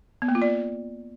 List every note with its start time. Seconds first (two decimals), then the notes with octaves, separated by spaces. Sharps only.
0.22 B3
0.28 A#3
0.35 F4
0.42 D5